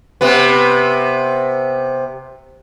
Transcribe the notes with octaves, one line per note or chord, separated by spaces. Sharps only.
C3 B3